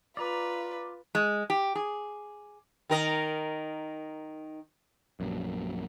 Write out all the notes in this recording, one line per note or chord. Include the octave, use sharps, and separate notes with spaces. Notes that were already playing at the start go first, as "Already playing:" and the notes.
F4 B4 D5 A#5
G#3
G4
G#4
D#3 A#4 D#5
A#1 F#2